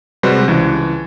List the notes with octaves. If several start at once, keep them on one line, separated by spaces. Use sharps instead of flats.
C3 G3 G#3 F#4 B4 C5
C#2 E3